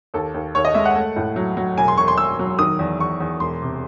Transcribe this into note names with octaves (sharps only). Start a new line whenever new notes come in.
D#2 A4
D#2
D#2 C#5
D#5
G#3 E5
F#5
A3
A2
F#3
F#3
E1 G#5
C6
E1 C#6
C6
E1 E6
F#3
D#3 D#6
E2
E2 C#6
E2
E1 C6
C3